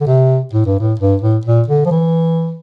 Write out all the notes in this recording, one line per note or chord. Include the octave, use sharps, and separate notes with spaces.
D3
C3
A2
G2
A2
G2
A2
A#2
D3
F3
E3